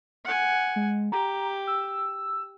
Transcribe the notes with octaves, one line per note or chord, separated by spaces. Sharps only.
F#5 G#5
G#3
G4 A#5
E6